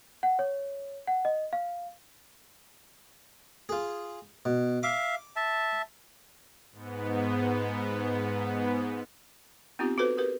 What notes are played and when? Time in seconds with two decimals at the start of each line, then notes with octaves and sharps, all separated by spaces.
0.23 F#5
0.39 C#5
1.07 F#5
1.25 D#5
1.53 F5
3.69 F4 G#4
4.45 B2
4.83 E5 F5 D6
5.36 E5 A5
6.72 G#2 B3
9.79 B3 C4 D#4 F4 G4
9.98 F#4 A4 B4 C5
10.18 G4 A#4 B4